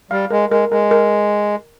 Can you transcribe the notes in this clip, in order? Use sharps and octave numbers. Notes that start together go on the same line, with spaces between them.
G3 F5
G#3 A#4
G#3 A#4
G#3 A#4
A#4